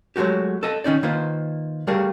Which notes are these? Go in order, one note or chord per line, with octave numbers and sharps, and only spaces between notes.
F#3 G#3 A3 F#4 G4
A4 D#5 A5
D#3 C#4 D#4 D5
D#3 A#3 F4 B4 C5
G3 A3 F#4 G#4 A#4 F5